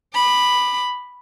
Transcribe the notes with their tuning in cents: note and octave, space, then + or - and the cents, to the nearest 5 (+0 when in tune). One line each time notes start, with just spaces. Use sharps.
B5 +0 D6 +35